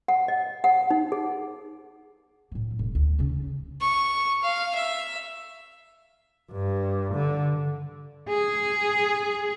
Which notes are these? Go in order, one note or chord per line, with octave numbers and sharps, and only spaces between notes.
F#5
D#5
F#5
D#4
G#4
A2 F#3
E1
D2
C#3 C#4
C#6
F5
E5
G2
D3
G#4